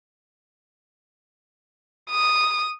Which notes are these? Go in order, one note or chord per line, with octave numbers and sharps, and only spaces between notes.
D#6